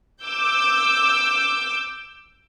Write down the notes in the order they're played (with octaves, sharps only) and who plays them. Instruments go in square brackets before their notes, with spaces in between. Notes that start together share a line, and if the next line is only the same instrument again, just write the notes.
[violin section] D6 E6 G6